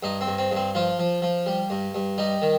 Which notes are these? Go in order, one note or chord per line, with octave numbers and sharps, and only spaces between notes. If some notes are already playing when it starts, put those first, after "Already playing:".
G2 D#4
C4
G2
C4
G2 C4
F3 F4
F3
F3
G3
G2
G2
G3 D#4
D#3